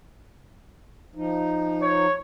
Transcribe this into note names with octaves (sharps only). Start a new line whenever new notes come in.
F3 D#4
C#5